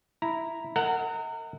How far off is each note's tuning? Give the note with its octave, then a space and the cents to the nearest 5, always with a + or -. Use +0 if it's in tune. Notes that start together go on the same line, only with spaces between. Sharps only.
E4 +0 A#5 +0
A#4 -35 D#5 +45 F#5 +5